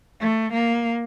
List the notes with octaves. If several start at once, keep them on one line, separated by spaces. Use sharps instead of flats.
A3
A#3